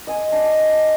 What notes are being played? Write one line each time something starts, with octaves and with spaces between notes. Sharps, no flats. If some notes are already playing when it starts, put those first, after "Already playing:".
D#5 G#5 C6
D4 D#5